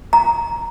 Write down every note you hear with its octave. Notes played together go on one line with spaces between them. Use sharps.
A#5